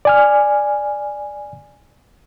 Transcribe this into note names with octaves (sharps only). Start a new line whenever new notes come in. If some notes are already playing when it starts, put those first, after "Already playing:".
D5 G#5 F6